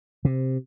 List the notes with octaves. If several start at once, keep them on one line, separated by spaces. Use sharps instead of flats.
C3